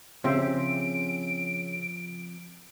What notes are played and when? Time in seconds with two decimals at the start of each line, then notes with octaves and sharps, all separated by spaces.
0.24 C#3 F3 C4 G4 C5 E5 D7